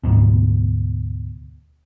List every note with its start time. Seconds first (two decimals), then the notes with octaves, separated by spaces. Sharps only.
0.03 D2 G#2 B2